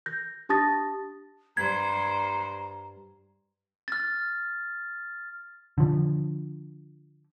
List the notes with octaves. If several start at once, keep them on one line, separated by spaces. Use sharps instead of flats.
G6 A#6
D4 G4 A5 D#6 A6 A#6
G2 C5 A#5 G#6
F6 A6
D3 F3